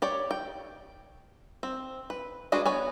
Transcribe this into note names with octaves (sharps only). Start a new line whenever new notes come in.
G4 C#5 D5
G5
C4
B4
G#3 D4 F#4 G#4 B4
B3 C#5 G#5